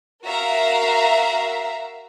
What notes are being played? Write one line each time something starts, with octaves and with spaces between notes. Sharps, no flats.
F#4 A#4 E5 F5 A#5